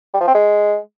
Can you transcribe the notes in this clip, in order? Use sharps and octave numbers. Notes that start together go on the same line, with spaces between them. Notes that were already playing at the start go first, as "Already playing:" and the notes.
G3
F3
C4
G#3